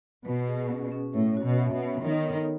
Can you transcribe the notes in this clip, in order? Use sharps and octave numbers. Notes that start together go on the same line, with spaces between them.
B2 B4
G#4
C#4
C#4
A2 C#5
F#4
B2
E5
B2
B3
D#3 C#5
A4